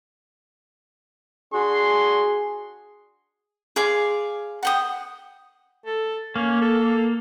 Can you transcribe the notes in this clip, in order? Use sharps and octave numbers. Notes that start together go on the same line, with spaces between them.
D4 F#4 G#4 C6
G#4 D5 F5 C6
F#5 G5 D#6
A4
A#3 C#4
A4